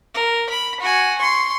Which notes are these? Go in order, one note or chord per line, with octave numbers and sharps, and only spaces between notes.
A#4
B5
F#4 G#5
C6 C#6